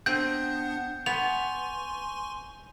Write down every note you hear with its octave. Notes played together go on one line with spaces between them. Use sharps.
B3 C4 D4 D#5 F#5 G6
B3 G#5 C6 C#6 F7